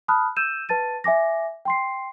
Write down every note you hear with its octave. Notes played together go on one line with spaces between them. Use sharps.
A5 B5 D#6 F6 F#6
E6 G6 D#7 E7
B4 A5 A6 D#7
E5 G#5 D6 A#6
G5 C6 C7